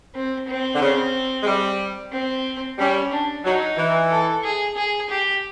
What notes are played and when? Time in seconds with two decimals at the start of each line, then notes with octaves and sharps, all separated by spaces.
0.14 C4
0.48 C4
0.75 D3
0.81 C#3
1.42 G#3
1.46 G3
2.12 C4
2.78 G3 C#4
3.12 D4
3.44 F#3 D#4
3.77 E3
4.10 A4
4.43 G#4
4.77 G#4
5.09 G4